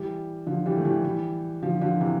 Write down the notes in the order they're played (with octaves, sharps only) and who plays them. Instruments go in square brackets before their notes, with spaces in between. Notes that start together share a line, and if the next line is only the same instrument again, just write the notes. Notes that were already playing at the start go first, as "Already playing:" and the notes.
Already playing: [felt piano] E3 G3
D3 F3
E3 G3
A3
E3 G3
E3 G3
D3 F3
D3 F3
C3 E3